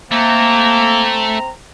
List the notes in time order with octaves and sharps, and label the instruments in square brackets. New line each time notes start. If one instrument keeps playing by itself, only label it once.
[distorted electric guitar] A3 [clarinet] A#3 [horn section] C4 A#5